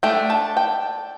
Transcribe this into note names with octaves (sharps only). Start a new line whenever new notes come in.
A3 D4 G5
A5
G5